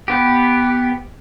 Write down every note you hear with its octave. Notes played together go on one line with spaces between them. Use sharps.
B3 G4